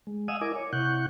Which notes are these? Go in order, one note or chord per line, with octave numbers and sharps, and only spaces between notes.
G#3
D#5 F5 F#5 G#5 D#6 E6
E4 A#4 D#5 G#5 D6
C#5
C3 E4 F#5 C#6 F#6 G6